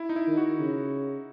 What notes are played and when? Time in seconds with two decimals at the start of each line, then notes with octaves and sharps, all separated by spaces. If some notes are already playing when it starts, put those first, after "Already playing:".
Already playing: E4
0.09 D#4
0.16 E4
0.27 D#3
0.37 F#4
0.59 C#3